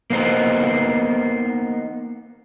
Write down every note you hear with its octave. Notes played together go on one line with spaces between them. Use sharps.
A#3 B3 D#4 C5